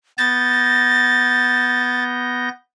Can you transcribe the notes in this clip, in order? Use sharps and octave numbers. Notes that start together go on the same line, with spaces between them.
B3 G6 A6 A#6